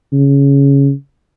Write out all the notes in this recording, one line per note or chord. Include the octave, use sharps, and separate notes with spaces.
C#3